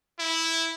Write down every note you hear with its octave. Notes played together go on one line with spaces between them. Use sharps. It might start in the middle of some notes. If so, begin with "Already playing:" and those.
E4